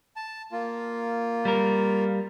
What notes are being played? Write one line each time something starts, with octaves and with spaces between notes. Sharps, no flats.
A5
A#3 F4
G3 A#4